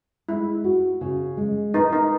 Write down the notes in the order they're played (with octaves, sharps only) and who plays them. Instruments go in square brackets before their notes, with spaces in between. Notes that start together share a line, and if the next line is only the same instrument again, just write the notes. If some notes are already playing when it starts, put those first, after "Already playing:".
[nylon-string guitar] G#3 [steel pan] E4
[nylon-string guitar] F#4
C#3
G#3
[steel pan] D#4 [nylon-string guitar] B4
[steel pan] D#4